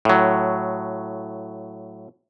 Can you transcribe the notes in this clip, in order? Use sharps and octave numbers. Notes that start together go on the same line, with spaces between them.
A2 F#3